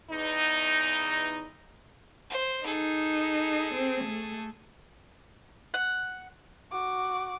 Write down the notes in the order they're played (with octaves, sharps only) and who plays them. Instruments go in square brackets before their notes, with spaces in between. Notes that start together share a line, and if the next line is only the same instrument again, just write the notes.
[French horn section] E2 D#4
[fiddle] C5
[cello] D#4 [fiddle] G#4 A4
[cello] C4
A3
[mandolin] F#5
[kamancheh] F#4 D6